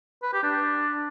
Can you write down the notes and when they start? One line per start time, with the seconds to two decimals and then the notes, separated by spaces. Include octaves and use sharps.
0.23 B4
0.33 G4
0.43 D4